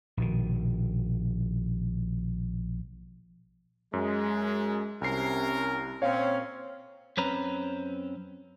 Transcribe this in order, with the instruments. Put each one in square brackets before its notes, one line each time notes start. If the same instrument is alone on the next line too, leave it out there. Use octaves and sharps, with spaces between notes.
[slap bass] A#1 B2 D#3
[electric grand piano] F#2 [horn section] G#3
[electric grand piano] C2 C7 [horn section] C3 C#4 A#4
[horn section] A#2 C4 C#4 [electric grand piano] C#5 F5
[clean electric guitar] F#2 C4 C#4 B4 A#5